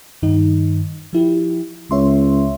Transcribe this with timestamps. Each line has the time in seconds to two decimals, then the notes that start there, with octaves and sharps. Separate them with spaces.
0.23 G2 D#3 D#4
1.13 F3 E4 G4
1.91 C#2 C#5 E5 C6